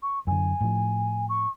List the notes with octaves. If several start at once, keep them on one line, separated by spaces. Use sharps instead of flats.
C#6
F#2 D3 G#5
A2 F3
C#6